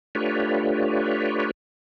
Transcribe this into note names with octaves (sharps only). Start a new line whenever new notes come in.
A3 D4 F4 G4 B4 C#5